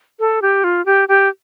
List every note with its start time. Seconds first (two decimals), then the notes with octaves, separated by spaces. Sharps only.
0.20 A4
0.42 G4
0.64 F4
0.86 G4
1.08 G4